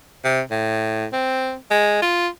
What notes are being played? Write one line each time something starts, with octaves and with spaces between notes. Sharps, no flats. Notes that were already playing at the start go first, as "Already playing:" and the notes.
C3
A2
C4
G#3
F4